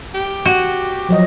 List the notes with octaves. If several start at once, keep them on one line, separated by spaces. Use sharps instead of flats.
G4
F#4
F3 F#3 D#5